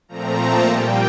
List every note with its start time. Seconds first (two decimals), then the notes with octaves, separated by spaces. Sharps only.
0.08 A#2 F3 A3 C4 A#5
0.38 A5
0.68 A#2 G3 A#3 G5